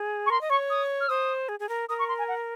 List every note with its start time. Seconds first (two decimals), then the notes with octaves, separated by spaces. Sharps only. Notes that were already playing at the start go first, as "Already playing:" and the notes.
Already playing: G#4
0.26 C#6
0.30 A#4 C6
0.41 D#5
0.50 C#5 C#6
0.70 D#6
1.00 F6
1.09 C5 D#6
1.49 G#4
1.60 G#4
1.69 A#4
1.89 A#4 D#6
1.99 C#6
2.08 C6
2.18 G#5
2.28 F#5